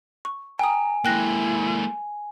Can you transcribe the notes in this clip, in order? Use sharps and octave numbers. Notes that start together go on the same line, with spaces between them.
C#6
G5 G#5 A#5 D#6
G#3 A#3 E4 G5 F#6 A#6